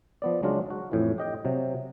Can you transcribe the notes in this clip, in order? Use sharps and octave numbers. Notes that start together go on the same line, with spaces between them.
F3 B3 D5
C#2 F#3 G#3 D4 F4
F#4
F2 A2 E3
G4 D#5 G5
C3 F#3